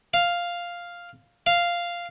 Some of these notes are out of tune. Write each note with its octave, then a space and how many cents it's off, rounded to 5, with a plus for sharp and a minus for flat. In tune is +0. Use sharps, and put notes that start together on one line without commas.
F5 +0
F5 -5